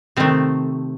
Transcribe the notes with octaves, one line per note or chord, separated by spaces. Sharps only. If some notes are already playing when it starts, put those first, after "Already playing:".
C3 D#3 A3 C4